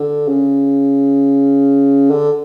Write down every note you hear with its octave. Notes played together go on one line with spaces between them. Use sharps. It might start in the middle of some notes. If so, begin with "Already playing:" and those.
Already playing: D3
C#3
D3